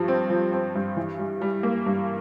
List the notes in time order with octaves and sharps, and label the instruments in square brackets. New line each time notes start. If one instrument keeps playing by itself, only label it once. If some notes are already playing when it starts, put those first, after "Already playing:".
Already playing: [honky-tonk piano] G2 F3
C4
F3
C4
G2
E3
G3
G3
A#3
G2